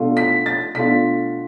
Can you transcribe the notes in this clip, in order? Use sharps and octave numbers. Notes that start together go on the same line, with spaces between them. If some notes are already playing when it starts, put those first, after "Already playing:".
Already playing: B2 A3 D4 F4
B6
A6
B2 A3 D4 F4 B6